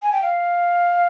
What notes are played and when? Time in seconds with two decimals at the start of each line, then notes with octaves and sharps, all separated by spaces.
0.02 G#5
0.12 G5
0.22 F5